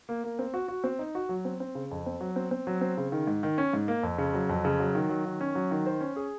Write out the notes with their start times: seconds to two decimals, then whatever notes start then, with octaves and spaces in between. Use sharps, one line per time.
0.09 A#3
0.24 A#3
0.39 C4
0.54 F#4
0.68 F#4
0.84 C4
0.99 D#4
1.15 F#4
1.29 F#3
1.45 C4
1.60 C4
1.75 C#3
1.91 F2
2.06 C4
2.21 F#3
2.36 C4
2.51 C4
2.67 F#3
2.81 C4
2.97 C#3
3.12 D#3
3.27 G#2
3.43 D#3
3.58 C#4
3.73 G#2
3.88 A#3
4.03 F2
4.18 C#3
4.34 F#3
4.49 F2
4.65 C#3
4.80 F#3
4.95 D#3
5.09 F#3
5.26 D#3
5.41 C#4
5.55 F#3
5.71 D#3
5.86 C5
6.01 C#4
6.16 G#4